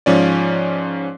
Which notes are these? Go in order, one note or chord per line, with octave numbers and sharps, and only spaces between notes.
G#2 F3 C#4 D5